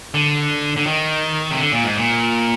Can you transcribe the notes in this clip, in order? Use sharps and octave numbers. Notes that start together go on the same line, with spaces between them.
D3
D3
D#3
C3
D3
A#2
G#2
A#2